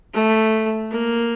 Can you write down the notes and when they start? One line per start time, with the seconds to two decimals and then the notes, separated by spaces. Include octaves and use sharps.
0.13 A3
0.91 A#3